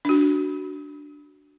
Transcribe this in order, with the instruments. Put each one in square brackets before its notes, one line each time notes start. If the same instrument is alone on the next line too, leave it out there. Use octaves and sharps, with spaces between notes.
[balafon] D4 F#4